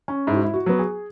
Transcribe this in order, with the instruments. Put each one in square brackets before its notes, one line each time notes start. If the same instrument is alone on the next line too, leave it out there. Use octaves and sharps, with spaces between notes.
[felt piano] C#4
[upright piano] G#2 [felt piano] E4
[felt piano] F#4
E4
F#4
[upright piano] F#3 B3
[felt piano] G#4